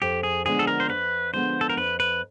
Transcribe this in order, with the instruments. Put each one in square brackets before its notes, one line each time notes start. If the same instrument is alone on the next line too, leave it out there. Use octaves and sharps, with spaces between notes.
[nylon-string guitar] F2 [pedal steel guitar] G4
[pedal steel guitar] G#4
[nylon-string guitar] D3 F3 G#3 B3 [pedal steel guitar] G#4
[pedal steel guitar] A4
A#4
C5
[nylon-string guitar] F2 [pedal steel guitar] B4
[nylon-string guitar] D3 F3 G#3 B3 [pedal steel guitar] C5
[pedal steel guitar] A4
A#4
[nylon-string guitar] F2 [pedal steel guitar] B4
[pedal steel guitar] B4